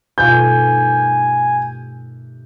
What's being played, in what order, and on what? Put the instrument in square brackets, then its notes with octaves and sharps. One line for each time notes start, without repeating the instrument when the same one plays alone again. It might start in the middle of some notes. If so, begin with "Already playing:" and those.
[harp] G2 D#3 A3 [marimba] B2 F4 F5 [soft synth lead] G#5 [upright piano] G6